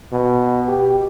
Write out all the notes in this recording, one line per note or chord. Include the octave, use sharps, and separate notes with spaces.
B2
G4